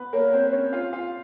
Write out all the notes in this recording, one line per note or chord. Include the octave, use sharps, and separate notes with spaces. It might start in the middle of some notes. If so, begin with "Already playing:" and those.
Already playing: B3 B4
A#3 A#4 C#5
C4 C5
C#4 C#5
F4 F5
F4 F5